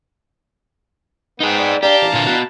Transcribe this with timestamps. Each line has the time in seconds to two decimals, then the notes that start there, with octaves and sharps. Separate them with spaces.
1.40 B3 C4 D#4 G#4
1.59 D5
1.83 D4 G4 D5 F5 A5 A#5
2.02 E3 D4
2.13 A#2 D3 F4
2.27 B3 F#4